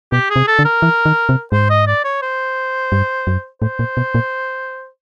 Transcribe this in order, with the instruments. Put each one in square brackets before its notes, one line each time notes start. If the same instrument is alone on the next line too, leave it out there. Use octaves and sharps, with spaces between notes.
[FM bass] B2 [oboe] G4
[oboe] G#4
[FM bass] C3
[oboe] A4
[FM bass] D3
[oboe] A#4
[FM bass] E3
D#3
C3
[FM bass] G#2 [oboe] C5
[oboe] D#5
D5
C#5
C5
[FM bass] G2
F#2
[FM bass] A2 [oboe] C5
[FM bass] A#2
B2
A#2